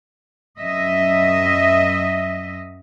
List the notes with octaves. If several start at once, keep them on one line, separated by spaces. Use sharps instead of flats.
F#2 D#5 E5